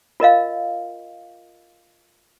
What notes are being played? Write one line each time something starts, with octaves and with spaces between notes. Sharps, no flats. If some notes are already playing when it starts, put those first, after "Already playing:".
F4 A#4 D#5 F5